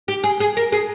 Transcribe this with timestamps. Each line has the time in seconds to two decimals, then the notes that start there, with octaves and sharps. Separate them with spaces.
0.08 G4
0.24 G#4
0.40 G#4
0.57 A#4
0.72 G#4